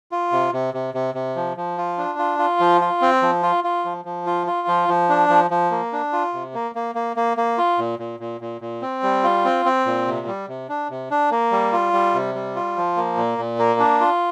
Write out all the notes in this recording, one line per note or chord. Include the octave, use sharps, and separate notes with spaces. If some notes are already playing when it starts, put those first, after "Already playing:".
F4
C3
C3
C3
C3
C3
F3
F3
F4
D4
F4
F4
F3
F4
C4
F3
F4
F4
F3
F3
F4
F4
F3
F3
D4
F3
F3
A#3
D4
F4
C3
A#3
A#3
A#3
A#3
A#3
F4
A#2
A#2
A#2
A#2
A#2
C4
G3
F4
C4
C4
A#2
C3
G3
C3
D4
C3
D4
A#3
G3
F4
G3
C3
G3
F4
F3
A#3
A#2
A#2
A#3
D4
F4